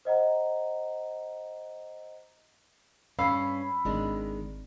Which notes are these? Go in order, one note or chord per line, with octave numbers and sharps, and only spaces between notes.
C5 D#5 F#5 A#5
G2 C#4 F5 B5 E6 C7
G#1 D#3 G#3 D4